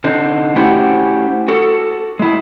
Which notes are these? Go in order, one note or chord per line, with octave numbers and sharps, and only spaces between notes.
D3 C4 D#4
A3 C#4 E4 F#4 G4 C5
F#4 A4
G#3 E4